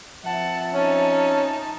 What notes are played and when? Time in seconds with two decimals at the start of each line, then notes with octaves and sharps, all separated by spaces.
0.25 F3 C4 E5 F#5 A5
0.73 C#4 D#4 A5